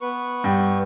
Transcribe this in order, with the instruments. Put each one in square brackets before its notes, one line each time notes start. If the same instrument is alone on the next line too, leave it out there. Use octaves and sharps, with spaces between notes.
[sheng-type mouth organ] B3 B4 C#6
[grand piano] G2 G5